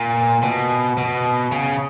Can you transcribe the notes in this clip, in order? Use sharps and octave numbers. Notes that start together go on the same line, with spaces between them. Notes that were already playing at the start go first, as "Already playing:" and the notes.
Already playing: A#2
B2
B2
C#3